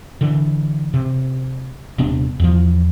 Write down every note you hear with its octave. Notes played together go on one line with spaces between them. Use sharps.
D3 E3
C3
D#1 C3 B3 D4
E2 F3